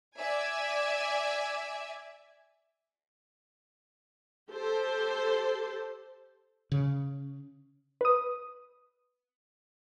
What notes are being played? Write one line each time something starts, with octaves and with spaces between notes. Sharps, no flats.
D5 E5 G#5
G4 A4 C5
C#3
B4 D#6